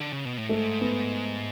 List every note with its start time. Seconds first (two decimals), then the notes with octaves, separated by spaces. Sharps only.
0.00 D3
0.13 C#3
0.25 B2
0.37 A2
0.49 G#2 A3
0.81 B3